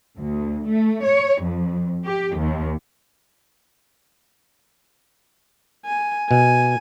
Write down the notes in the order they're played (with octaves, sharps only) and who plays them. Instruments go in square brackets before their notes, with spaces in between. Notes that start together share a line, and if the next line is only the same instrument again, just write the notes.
[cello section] D2
A3
C#5
F2
G4
D#2
[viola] G#5
[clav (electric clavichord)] B2 [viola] G#5